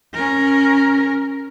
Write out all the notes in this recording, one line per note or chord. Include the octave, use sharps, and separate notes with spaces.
C#4 A#4